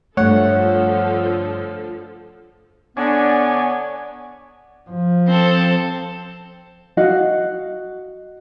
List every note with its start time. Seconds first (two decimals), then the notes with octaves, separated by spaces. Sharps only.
0.17 G2 D3 F3 A3 A4 C#5 F#5
2.97 D3 B3 D4 C#5 D5 G#5
4.90 F3
5.27 C4 A4
6.97 F#4 D#5 F5 F#5